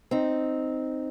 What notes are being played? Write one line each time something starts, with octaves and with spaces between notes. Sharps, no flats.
C4 D#4